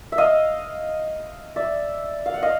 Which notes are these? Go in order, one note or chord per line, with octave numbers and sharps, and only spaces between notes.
E5
D#5 F5
D5 E5
F5
F#5
D#5 F5